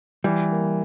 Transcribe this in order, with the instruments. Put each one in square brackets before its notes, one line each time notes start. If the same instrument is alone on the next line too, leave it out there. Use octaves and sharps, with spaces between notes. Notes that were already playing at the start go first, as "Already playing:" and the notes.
[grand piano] E3 [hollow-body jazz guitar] G3
[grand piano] A#3